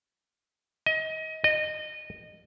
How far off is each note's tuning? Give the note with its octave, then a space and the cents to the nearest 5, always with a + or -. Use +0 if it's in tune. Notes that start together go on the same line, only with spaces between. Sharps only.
D#5 +25
D#5 -25